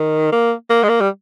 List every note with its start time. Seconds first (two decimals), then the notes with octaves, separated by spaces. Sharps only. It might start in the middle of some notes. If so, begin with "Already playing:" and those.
Already playing: D#3
0.32 A#3
0.70 A#3
0.83 G#3
0.89 A#3
1.01 G3